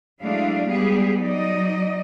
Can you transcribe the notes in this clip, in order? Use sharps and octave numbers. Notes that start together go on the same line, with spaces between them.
F#3 G#3 A3 D4 E4 F5
G3 G#3 B3 G4 G#4
F#3 D#4 D5 D#5